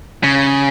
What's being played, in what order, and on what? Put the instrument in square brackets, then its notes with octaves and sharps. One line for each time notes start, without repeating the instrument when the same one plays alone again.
[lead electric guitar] C#3